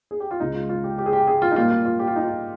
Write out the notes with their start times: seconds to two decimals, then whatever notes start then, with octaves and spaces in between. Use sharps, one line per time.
0.11 G#4
0.20 G4
0.31 F4
0.40 C#2 C#3 G#3 D#4
0.55 F4
0.69 F4
0.84 G4
0.98 G4
1.06 G#4
1.13 G4
1.27 G#4
1.42 F4
1.51 D#4
1.56 A#2 G3 A#3 F4
1.71 F4
1.85 F4
1.99 G4
2.07 F4
2.16 D#4
2.24 F4